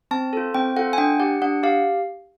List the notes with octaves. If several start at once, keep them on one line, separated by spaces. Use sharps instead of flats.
C4 A5
F4 A4
C4 G5
F4 A4 F#5
G#5
D4 G5
G4 F#5
D4 F#5
G4 F5